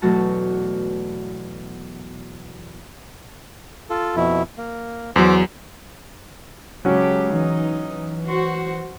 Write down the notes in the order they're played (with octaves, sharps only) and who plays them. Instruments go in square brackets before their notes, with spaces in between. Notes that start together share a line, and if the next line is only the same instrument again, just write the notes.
[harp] E2 B2 F#3 A3 F#4 A5
[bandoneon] F4 A4
F2 B2 E4
A#3
[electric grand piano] E2 F#3 [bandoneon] C5 D6
[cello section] C#3 G#3 G4 [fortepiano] F#3 C#4 [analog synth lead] A5
[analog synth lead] E3 [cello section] D#4
[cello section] F#4 C5